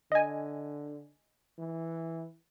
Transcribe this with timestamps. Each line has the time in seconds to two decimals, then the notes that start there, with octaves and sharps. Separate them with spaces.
0.12 D3 D#5 G#5
1.59 E3